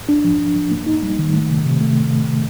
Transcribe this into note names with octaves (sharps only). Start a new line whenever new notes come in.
D4
F3
D4
F3
A#3
D#4
G3
D#3
A3
C3
C3
A3